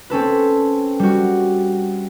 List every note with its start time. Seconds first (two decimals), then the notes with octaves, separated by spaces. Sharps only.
0.10 C4 C#4 A4 B4
0.99 G3 F#4